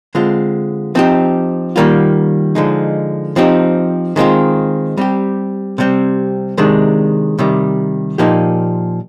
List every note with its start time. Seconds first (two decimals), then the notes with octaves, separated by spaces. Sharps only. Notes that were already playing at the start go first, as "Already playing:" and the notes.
0.15 D3 G#3 C4 F4
0.95 F3 C4 D#4 G4
1.76 D#3 G3 A#3 F4
2.55 D3 F3 G#3 D#4
3.36 F3 C4 D#4 G4
4.16 D#3 G#3 C4 F4
4.97 G3 C4 G4
5.78 C3 G3 C4
6.58 C3 D#3 G#3 D4
7.39 C3 D#3 G3
8.18 A#2 F3 A#3 D#4 G4